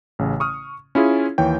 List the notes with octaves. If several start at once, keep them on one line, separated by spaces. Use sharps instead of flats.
A1 C#3
C#6 D#6 F6
C#4 E4 F4 G#4
D#2 E3 C#5 G5